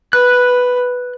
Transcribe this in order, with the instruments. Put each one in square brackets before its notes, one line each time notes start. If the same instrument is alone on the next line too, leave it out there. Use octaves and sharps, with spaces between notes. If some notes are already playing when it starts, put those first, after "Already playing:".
[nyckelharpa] B4 [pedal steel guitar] F#6